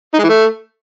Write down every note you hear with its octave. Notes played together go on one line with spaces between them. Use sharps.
D#4
G#3
E3
A3